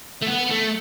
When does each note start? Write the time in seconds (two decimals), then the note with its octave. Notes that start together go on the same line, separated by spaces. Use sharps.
0.22 A3
0.26 B3
0.50 A3